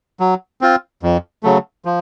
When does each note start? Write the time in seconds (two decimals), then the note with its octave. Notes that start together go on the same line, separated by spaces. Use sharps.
0.20 F#3
0.61 C4 F4
1.03 F2
1.43 C#3 F#3 A3
1.85 F3